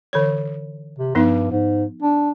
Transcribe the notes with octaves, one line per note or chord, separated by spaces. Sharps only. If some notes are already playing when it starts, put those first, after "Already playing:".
D3 E3 C#5
C3
G2 F3 B3 D#4
G#2
D4